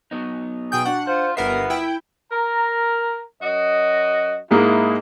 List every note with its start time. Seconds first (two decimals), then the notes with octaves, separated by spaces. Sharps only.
0.11 F#3 B3 D#4
0.72 B2 G#4 G5 G6
0.85 D4 F#4 F#5
1.07 F4 C5
1.37 G1 B3 F4 A#4 B4 E5 C7
1.70 E4 G5
2.32 A#4 A#5
3.42 F#2 F#4 D#5
4.51 G#2 G#3 A#3 E4